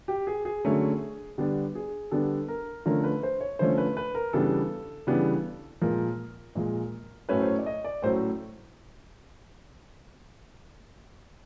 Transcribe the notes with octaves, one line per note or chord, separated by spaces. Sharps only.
G4
G#4
G#4
D3 F#3 A3 C#4
D3 G3 B3 D4
G#4
D3 G3 B3 D4 A4
A#4
D3 F3 A3 C#4 A#4
B4
C5
C#5
D3 F3 A3 C#4 C5
B4
B4
A#4
C#3 E3 G3 B3 D4 A4
C#3 E3 G3 B3 D4
A#2 F3 G#3 A#4
A#2 F3 G#3
A2 F#3 A3 C#4 B4
C5
C#5
D5
D#5
D5
A2 F#3 A3 C#4 C5